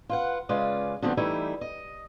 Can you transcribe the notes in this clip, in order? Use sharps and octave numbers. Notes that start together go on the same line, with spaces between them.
F4 B4 F#5
C#3 G#3 C#4 F4 B4 D5
D3 F3 G3 A3 B3 C4
E3 G3 A3 D#4 E4
D#5